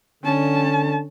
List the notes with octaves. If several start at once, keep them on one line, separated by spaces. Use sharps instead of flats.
D3 C#4 A5